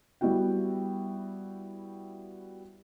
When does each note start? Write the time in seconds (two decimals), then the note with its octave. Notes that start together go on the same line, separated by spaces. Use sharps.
0.21 G3 B3 E4 F#4 G5